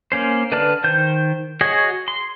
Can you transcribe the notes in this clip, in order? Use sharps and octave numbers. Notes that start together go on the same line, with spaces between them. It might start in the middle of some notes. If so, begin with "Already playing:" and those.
A#3 C#4 C5
D3 B4 D5 A5 F6
D#3 C5 G6
F#4 G#4 C#5 D#5 F#5
C6